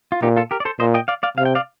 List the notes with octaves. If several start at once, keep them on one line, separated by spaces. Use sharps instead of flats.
F4
A#2 D#4 G4
F4 A4
G4 A#4
D5
A4 C5
A#2 C5 D#5
D#5 G5
D5 F5
D5 F5
C3 F5
G5
D5 F5